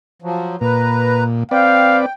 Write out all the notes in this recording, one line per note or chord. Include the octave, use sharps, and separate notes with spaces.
F3 F#3
A#2 B4 A#5
C4 B4 D5 F5 G5